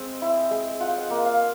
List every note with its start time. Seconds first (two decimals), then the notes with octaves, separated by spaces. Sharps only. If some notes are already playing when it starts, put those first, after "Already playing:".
Already playing: G#3 C4
0.22 E4
0.51 G#3
0.80 F4 F#5
0.89 G5
0.98 F#5
1.10 A#3
1.25 F5